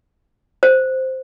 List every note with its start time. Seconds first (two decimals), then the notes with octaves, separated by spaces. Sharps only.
0.63 C5